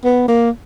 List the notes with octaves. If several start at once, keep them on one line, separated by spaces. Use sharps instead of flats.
B3
A#3